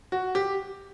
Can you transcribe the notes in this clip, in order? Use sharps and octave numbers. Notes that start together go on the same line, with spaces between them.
F#4
G4